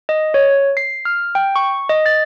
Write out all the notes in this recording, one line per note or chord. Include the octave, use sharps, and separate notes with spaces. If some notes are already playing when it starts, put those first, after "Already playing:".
D#5
C#5
C7
F6
G5
C#6
D#5
A6